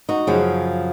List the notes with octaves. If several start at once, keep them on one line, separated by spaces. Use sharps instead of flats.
D#4 F#4
F#2 C#3 F3